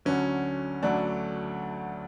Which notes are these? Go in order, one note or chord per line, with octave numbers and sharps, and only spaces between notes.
D2 D3 F#3 C#4
D2 D3 F#3 A3 D4